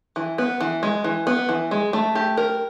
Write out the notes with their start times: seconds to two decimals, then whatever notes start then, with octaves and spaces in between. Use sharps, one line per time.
0.16 E3
0.38 B3
0.61 E3
0.83 G#3
1.04 E3
1.27 B3
1.49 E3
1.71 G#3
1.93 A3
2.15 G4
2.37 A#4